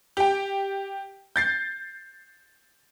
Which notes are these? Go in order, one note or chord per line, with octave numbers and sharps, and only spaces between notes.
G4 G5
G6 A6 C7